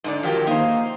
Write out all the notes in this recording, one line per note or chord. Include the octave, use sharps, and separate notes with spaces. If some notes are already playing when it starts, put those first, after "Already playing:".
G#2 D3 D5
D#3 F3 F#3 G4
A#3 D#4 C5